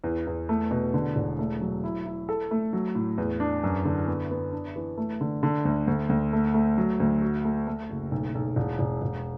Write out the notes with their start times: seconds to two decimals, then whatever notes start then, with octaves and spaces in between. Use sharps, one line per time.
0.04 E2
0.27 E2
0.49 A3
0.71 B2
0.94 D3
1.16 E1
1.39 A3
1.61 F#3
1.84 E4
2.06 E4
2.29 A4
2.51 A3
2.73 F#3
2.95 A2
3.18 E2
3.40 D4
3.64 F#2
3.85 D3
4.07 B3
4.31 B3
4.52 D4
4.76 E3
4.97 A3
5.21 D3
5.43 D3
5.65 D2
5.87 D2
6.09 D2
6.33 A3
6.54 A3
6.78 F#3
7.00 D2
7.22 F#4
7.45 A3
7.67 A3
7.90 F#1
8.11 B1
8.35 B1
8.56 E1
8.79 E1
9.02 E1